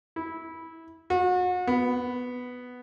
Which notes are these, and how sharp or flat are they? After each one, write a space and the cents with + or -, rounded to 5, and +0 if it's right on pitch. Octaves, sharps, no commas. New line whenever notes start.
E4 -15
F#4 -35
B3 +5